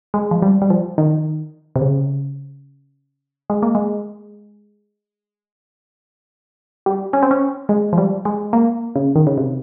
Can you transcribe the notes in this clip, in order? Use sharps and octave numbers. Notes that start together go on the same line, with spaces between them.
G#3
F3
G3
G3
F3
D#3
C3
C#3
G#3
A#3
G#3
G3
C#4
C4
C#4
G#3
F3
G3
G#3
A#3
C#3
D#3
C#3
C3